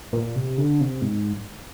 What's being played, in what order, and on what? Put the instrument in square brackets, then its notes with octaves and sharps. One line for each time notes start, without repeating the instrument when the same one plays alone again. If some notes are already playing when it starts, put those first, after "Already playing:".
[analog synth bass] A#2
C3
D3
C3
G#2